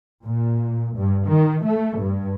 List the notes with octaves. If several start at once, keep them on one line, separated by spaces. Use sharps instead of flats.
A#2
G2
D#3
A3
G2